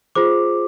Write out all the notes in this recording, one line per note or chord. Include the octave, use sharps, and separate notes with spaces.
F4 G#4 C5 D6